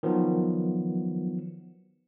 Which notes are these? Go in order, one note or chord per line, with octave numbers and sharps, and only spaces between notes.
D#3 F3 F#3 B3